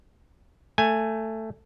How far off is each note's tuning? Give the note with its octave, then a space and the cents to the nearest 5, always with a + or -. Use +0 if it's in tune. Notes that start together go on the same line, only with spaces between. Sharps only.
A3 +10 G#5 +0